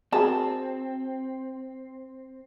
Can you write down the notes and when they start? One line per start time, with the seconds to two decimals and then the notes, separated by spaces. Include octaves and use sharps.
0.12 C4 F#4 G#4 A#4 A5